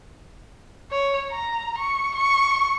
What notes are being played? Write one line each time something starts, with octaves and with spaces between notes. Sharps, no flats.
C#5
A#5
C#6
C#6